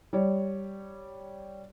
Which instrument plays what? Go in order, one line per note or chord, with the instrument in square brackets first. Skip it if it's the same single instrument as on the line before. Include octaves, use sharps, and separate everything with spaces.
[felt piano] G3 C#5